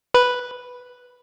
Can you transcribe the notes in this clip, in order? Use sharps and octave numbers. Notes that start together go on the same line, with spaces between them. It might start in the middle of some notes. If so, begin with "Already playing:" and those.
B4